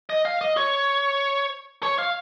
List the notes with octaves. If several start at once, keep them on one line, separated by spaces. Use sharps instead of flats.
D#5
F5
D#5
C#5
C#5
F5